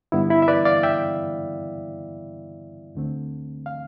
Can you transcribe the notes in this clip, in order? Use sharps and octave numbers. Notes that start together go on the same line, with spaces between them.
G2 D3 G3 B3 E4
E4
E5
B4 D5
D5 F5
E5 G5
D2 D3 A3 C4
F5